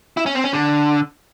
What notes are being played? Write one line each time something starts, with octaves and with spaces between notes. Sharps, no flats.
E4
C#4
C4
C#4
D3